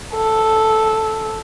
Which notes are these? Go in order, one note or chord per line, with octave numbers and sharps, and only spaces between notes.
A4